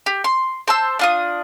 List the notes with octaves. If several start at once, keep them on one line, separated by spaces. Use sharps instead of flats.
G4
C6
C5 A5 E6
D4 F4 D#6